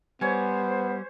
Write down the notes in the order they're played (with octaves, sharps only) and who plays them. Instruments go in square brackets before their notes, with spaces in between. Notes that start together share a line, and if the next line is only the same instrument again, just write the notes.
[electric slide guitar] G3 [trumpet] B3 [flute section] C5 [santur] C#5 G#5